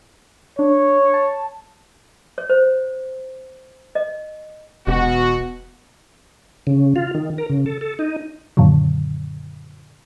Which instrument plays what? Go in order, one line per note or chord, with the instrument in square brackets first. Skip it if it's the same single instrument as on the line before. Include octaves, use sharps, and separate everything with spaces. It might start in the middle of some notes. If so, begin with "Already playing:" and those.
[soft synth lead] D4 [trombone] C#5
[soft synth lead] A5
[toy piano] C#5
C5
D#5
[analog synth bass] E1 [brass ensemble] B2 F#4
[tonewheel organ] C#3
F4
D#3
A#4
C#3
A4
A4
D#4
[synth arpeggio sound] F#2 A#2 D3 D#3 F#3